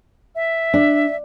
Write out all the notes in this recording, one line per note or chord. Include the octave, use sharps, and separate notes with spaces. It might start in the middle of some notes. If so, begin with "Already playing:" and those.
E5
D4